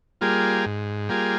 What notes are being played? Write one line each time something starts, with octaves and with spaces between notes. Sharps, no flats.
G3 A#3 F4 G#4
G#2
G3 A#3 F4 G#4